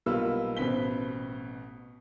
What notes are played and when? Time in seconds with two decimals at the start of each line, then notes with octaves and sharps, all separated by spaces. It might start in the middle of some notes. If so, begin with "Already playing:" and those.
0.06 B1 G3 A#3 B3 F4 E6
0.57 A1 B2 C4 B4 B6 G7